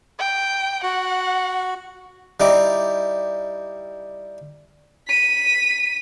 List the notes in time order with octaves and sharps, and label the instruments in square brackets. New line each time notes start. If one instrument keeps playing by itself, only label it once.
[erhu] G5
[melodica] F#4 [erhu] F#5
[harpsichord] G3 D#4 E4 D6
[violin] B6 D#7